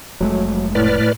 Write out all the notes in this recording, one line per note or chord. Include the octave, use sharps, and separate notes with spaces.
F1 F#3 G#3 A3
A2 B4 D5 F6